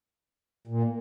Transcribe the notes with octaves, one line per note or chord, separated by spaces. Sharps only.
A#2